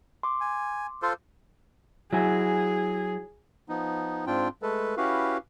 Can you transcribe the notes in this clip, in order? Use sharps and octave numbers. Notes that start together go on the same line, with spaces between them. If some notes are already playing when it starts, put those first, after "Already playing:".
C6 D6
G#5
F4 A4 C5
F#3 E4 G#4 G#5
F3 B3 D#4
G#2 C4 D4 F4 G5
G#3 A3 A4 B4
C#4 E4 F#4 G4 B4 F5